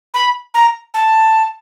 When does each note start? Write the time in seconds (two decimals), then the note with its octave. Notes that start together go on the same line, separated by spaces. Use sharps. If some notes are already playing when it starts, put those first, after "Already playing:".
0.14 B5
0.54 A#5
0.94 A5